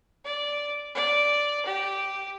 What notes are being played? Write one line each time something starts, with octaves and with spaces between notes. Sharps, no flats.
D5
D5
G4